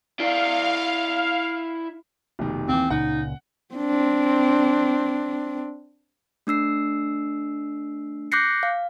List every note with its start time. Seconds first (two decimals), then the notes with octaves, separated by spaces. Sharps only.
0.20 E4 D5 F5
2.39 F1 B2 D#3
2.68 D#2 E3 C4
2.90 C#2 A#2 C#3 D#4 F#5
3.75 C4 D4
6.47 A3 D4 E6 C7
8.32 D6 F#6 G6 A#6 C7 C#7
8.63 F5